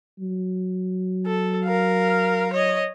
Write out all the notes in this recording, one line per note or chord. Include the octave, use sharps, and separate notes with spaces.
F#3
A4
A#4 F5
C#5 D#5